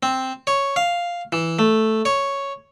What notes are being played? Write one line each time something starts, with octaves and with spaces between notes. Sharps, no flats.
C4
C#5
F5
E3
A3
C#5